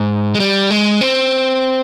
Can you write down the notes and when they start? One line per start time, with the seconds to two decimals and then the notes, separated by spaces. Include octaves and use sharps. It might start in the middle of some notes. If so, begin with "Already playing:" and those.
Already playing: G#2
0.35 G#3
0.40 G3
0.70 G#3
1.01 C4